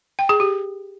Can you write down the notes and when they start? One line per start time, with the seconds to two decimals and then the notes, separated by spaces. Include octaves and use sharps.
0.19 G5
0.29 G#4
0.40 G4